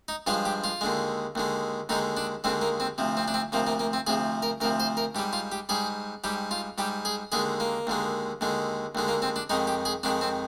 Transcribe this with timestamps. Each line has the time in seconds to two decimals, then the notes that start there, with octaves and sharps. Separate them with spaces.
0.08 D#4
0.27 G2 F3 G#3 F4
0.45 G4
0.64 F4
0.81 D#2 D3 G#3
1.35 D#2 D3 G#3
1.89 D#2 D3 G#3 D#4
2.17 D4
2.44 D#2 D3 G#3 C4
2.61 A#3
2.80 C4
2.98 D2 C3 F3
3.17 C4
3.28 D4
3.34 C4
3.52 D2 C3 F3 A#3
3.67 A#3
3.79 A#3
3.93 C4
4.07 D2 C3 F3 G#4
4.42 A#4
4.61 D2 C3 F3 A#4
4.80 C5
4.97 A#4
5.15 G#2 G4
5.19 G3
5.33 F4
5.52 G4
5.69 G#2 G3 G#4
6.24 G#2 G3 G4
6.51 F4
6.78 G#2 G3 G4
7.05 G#4
7.32 D#2 D3 G#3 G#4
7.60 A#3
7.87 D#2 D3 G#3
8.41 D#2 D3 G#3
8.95 D#2 D3 G#3
9.08 A#3
9.22 C4
9.36 D4
9.50 F2 D#3 G#3 D#4
9.67 G4
9.85 G#4
10.03 F2 D#3 G#3 D4
10.21 C4